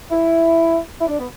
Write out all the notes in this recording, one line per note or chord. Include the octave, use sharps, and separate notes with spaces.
E4
E4
D4
B3